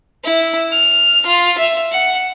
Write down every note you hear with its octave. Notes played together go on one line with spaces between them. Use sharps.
E4
F6
F4
E5
F#5